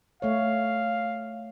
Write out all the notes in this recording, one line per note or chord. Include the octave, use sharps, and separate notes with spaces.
A3 C#5 F5